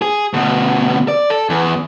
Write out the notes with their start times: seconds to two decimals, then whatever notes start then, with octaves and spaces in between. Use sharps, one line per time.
0.02 G#4
0.33 D2 B2
1.08 D5
1.30 A4
1.50 E2